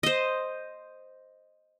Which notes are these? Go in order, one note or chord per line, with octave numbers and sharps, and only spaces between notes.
C5 D#5